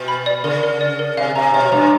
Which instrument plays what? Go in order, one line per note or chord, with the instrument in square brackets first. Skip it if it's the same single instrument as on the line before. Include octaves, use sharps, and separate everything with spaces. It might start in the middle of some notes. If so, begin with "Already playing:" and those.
Already playing: [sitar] B2
[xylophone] B5
D5
[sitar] C#3 [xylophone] A#4
[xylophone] A#4
D5
A#4
[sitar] C3 [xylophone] F5
[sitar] C3 [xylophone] A#5
[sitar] B2 [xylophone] C#5
[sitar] G2 [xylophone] A#5